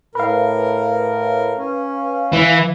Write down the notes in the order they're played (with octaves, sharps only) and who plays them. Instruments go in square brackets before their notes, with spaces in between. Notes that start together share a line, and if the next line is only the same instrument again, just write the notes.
[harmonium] A2 A#4 [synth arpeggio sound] B4 F5
[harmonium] C#4
[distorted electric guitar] E3